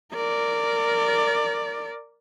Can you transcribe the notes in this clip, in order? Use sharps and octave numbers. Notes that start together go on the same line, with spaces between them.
A#4 D5